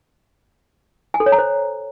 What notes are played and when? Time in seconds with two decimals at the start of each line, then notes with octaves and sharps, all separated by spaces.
1.14 G#5
1.20 A4
1.26 C#5
1.32 A#5
1.38 C5